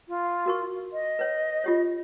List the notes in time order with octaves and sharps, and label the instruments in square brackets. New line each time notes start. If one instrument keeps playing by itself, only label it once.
[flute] F4
[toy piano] F#4 A#4 C#6
[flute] D#5
[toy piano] B4 C#5
F4 G4 C#5